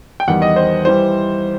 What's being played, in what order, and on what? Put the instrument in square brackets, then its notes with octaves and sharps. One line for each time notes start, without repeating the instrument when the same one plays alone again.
[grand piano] G5
E2 D#3 G3 F#5
D#5
C5
E3 G3 C5